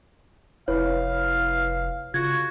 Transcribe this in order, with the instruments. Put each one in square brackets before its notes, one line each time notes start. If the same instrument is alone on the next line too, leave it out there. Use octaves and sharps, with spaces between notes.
[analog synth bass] F1 [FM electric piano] E4 B4 [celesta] C#5 [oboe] F5
[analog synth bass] C#3 [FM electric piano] F4 [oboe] F#4 [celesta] G#6